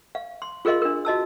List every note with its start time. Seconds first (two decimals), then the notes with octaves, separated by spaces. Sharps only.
0.15 F5
0.42 C6
0.65 F4 G#4 A#4 D#5 F5 C6
0.82 D4 A#4
1.05 F#4 D#5 A5 E6